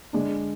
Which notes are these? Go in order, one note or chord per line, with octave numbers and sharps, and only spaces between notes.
D3 G#3 D4